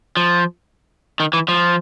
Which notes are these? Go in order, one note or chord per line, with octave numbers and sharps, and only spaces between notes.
F3
D#3
E3
F3